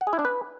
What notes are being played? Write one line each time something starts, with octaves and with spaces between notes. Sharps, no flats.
F#5
G#4
E4
D4
B4